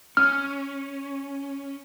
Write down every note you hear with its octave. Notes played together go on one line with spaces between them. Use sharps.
C#4 F6